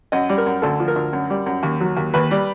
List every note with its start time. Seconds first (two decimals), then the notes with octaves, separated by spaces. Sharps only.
0.12 F#2 D#5
0.29 G3
0.38 A#4
0.46 F#2
0.62 D2 A4
0.80 F3
0.88 A#4
0.96 D2
1.13 F#2
1.30 G3
1.46 F#2
1.63 D#2
1.81 F#3
1.97 D#2
2.14 D#2 B4
2.31 G3